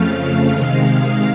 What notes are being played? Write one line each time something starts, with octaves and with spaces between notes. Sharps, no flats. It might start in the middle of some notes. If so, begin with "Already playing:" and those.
Already playing: F2 C#3 F3 A3 F5
C3 D#3 G#3